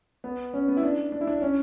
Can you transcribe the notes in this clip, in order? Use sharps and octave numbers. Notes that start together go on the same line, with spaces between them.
B3
C#4
B3
E4
D4
D4
E4
D4
C#4